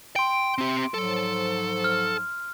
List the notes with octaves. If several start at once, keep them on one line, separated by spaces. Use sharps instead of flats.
G5 C6 D7
C4 G4
G#2 F3 F#3 A4
F6